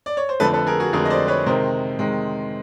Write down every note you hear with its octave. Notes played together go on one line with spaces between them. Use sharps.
D5
C#5
C5
F2 D3 F3 A3 A4 B4
A4 B4
G#4 A#4
F#4 G#4
F2 D3 F3 A3 G#4 A#4
D#5
C5 D5
B4 C#5
C3 D#3 G#3 A#4 C5
C3 D#3 G#3